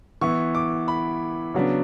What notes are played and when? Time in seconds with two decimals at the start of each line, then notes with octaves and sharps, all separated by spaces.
0.21 E3 B3 E4 C#6
0.55 D6
0.88 B5
1.54 C#3 F#3 B3 D4